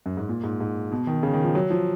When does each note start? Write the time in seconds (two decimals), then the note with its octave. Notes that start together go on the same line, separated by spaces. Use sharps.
0.06 F#2
0.17 G#2
0.29 A#2
0.44 G#2
0.61 G#2
0.92 B2
1.07 D#3
1.23 C#3
1.34 D#3
1.44 F3
1.55 F#3
1.70 F3